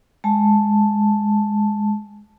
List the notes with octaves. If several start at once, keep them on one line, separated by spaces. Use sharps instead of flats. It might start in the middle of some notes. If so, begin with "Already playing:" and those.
G#3 A5